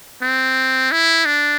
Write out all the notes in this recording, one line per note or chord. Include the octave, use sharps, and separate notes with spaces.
C4
E4
D4